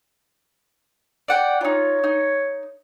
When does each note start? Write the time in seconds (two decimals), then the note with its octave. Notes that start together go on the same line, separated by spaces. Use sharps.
1.28 D5 F#5 G5
1.61 D#4 F4 C#5
2.04 D#4